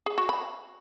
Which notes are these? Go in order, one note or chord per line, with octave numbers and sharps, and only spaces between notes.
G#4
F#4
B5